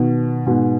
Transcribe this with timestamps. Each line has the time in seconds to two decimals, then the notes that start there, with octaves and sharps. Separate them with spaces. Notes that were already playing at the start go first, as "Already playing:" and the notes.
Already playing: B2 D#3
0.46 G#2 B2